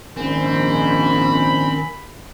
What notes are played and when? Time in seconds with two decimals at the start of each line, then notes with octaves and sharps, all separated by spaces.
0.17 A#1 G#2 D#3 C4 C#4 B5